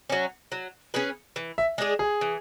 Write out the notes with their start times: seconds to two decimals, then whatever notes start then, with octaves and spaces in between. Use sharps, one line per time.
0.10 F#3 C#4
0.52 F#3
0.94 C#4 G#4 B4
1.36 E3
1.58 E5
1.78 G#3 D4 G#4
1.99 G#4
2.21 E3